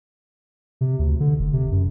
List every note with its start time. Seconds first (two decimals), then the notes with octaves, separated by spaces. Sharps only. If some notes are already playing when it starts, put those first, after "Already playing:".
0.81 C3
0.99 D2
1.20 D3
1.39 F1
1.53 C3
1.71 F#2